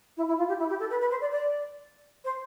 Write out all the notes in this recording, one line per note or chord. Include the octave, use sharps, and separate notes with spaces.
E4
E4
F4
G4
E4
G4
A4
B4
B4
C5
D5
D5
C5